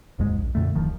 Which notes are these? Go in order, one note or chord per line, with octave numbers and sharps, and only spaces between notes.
F1 D#2 G#2 G#3
A#1
F2 A#2 D3 A3
D1 D#3 F3